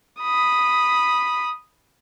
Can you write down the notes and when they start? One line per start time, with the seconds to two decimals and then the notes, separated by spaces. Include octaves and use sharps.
0.21 B5 D#6